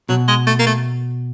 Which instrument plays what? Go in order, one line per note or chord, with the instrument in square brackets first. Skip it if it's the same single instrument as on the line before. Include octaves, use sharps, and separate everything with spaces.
[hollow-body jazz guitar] B2 [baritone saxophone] F#3
[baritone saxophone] G#3
A3
A#3
A3